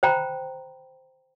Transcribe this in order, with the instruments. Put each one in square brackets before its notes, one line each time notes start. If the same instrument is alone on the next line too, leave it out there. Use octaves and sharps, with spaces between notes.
[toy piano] C5 G5 A#5 B5